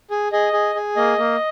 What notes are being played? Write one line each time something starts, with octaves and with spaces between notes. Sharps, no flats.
G#4
G#4 D#5
G#4
G#4
A#3 D#5
A#3